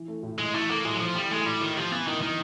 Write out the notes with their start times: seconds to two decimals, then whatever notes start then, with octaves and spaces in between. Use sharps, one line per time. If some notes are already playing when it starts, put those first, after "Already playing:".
Already playing: E3
0.08 A3
0.23 A2
0.38 A2 G#3
0.54 E3 A3
0.69 A3 A#3
0.85 A2 G#3
0.94 F#3
1.00 A2 F3
1.15 E3 G3
1.30 G#3 A3
1.46 A2 G3
1.61 A2 D#3
1.76 F3 G3
1.91 E3 B3
2.07 D#3 E3
2.22 D#3 E3